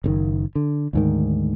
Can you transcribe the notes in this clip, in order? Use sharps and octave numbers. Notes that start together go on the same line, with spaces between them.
F#1 C3 D#3
D3
D2 G#2 D#3